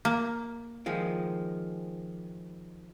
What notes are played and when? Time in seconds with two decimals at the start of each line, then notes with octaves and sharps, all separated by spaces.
0.05 A#3
0.86 D#3 F3 G#3